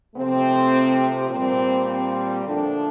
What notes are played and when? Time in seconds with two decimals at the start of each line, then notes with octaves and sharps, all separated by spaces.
0.15 C3 F3 A3 C4
1.30 A#2 G3 C4
1.87 C4
2.45 D3 F3 A3 D4